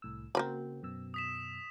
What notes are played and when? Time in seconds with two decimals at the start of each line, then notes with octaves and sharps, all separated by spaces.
0.02 C2 A2 E6
0.35 C#3 A#3 C4 F#4 A#4 B5
0.83 F#2 B2 E6
1.14 D#6 B6 E7